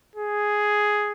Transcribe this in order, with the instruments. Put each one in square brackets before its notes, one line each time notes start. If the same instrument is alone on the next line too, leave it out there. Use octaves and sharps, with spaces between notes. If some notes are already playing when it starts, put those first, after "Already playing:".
[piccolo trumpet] G#4